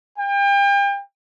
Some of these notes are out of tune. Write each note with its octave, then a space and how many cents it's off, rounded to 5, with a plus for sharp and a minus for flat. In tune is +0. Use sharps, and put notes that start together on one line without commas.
G5 +35